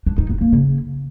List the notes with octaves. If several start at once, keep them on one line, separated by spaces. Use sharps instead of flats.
D4
D#4
B3
A#3
C#3